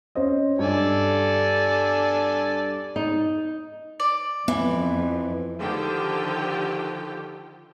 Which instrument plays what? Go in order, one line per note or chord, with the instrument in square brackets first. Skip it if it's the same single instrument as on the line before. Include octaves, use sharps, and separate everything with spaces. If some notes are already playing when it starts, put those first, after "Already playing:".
[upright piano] C#4 C5 D#5
[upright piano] G2 [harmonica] A4 D5 G#5
[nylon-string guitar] D#4
[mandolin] D5
[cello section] F2 [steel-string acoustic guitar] E3 [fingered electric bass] B3
[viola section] D3 D#3 F3 G4 G5